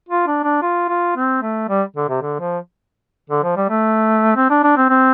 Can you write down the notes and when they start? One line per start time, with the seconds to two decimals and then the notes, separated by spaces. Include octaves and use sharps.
0.09 F4
0.27 D4
0.44 D4
0.62 F4
0.89 F4
1.16 C4
1.42 A3
1.69 G3
1.97 D3
2.09 C3
2.22 D3
2.40 F3
3.30 D3
3.43 F3
3.57 G3
3.69 A3
4.36 C4
4.50 D4
4.64 D4
4.77 C4
4.90 C4